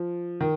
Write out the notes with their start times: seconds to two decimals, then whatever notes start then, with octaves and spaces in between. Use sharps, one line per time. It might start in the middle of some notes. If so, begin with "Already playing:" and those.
Already playing: F3
0.41 D#3